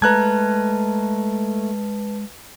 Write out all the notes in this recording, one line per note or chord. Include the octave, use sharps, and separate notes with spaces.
G#3 A3 B4 A5 A#5 F#6 G#6